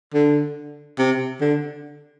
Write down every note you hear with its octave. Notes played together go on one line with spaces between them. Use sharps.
D3
C3
D3